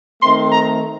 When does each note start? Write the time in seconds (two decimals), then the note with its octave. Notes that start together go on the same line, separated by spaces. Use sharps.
0.21 D#3 A3 C4 C6
0.52 A#5